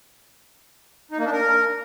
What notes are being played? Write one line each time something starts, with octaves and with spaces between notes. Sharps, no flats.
D#4
A#3
D4
A#4